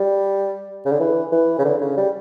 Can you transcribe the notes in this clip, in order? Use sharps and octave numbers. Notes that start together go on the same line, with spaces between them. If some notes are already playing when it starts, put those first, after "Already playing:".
Already playing: G3
C#3
D3
E3
E3
C#3
D3
C#3
G3